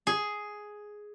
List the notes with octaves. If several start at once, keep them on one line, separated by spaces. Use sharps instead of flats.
G#4